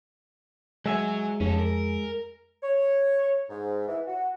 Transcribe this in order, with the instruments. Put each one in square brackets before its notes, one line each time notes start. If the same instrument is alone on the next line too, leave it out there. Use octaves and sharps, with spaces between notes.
[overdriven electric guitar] F#3 [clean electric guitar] G#3 E5 G#5
[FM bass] F2 [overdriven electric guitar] C#4 A4
[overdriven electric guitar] A#4
[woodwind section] C#5
G#2
E3
F#4